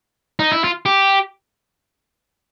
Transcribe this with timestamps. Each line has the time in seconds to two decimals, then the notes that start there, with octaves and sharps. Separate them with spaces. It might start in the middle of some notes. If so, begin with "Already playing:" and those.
0.39 D#4
0.52 E4
0.64 F4
0.86 G4